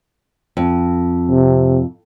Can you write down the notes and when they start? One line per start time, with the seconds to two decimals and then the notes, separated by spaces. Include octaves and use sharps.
0.57 F2
1.31 C3